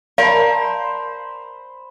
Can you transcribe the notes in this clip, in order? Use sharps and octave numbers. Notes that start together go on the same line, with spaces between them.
A#4 C5 D5 F5 A5 B5